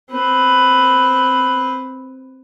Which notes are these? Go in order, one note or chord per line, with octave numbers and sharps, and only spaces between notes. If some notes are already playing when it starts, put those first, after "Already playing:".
C4 B4